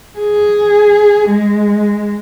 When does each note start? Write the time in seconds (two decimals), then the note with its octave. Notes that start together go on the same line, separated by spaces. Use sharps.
0.18 G#4
1.29 G#3